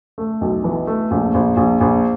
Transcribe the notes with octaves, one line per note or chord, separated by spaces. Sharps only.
A3
B1
E3
A3
A#1
A#1
A#1
A#1